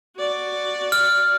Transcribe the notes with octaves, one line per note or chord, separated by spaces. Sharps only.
F#4 D5
F6